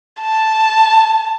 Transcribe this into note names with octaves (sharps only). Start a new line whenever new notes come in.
A5